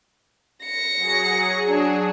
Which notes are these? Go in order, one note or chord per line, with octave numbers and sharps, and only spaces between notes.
A#6 C#7
F#3 G#4
D4